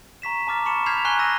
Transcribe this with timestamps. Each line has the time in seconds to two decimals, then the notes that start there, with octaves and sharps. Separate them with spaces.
0.22 A#5 C#6 B6 E7
0.47 A5 A#5 D6 F6 A6
0.66 B5 C#6 C#7 E7
0.86 F6 G6 G#6 B6 C7 F7
1.05 G#5 A#5 C#6 F#6 C7 G7
1.19 E6 G6 A#6 D#7